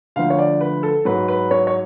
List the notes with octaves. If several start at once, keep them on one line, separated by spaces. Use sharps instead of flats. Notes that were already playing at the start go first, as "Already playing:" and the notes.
D2 D3 F3 F5
C#5
D5
B4
A4
G#2 F#3 B4
B4
C#5
C#5